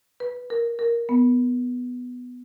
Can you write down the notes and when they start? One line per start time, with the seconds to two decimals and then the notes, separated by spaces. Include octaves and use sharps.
0.20 B4
0.50 A#4
0.79 A#4
1.09 B3